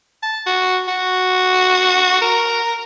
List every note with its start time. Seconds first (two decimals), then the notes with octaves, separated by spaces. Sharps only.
0.23 A5
0.46 F#4
0.88 F#4
2.21 A#4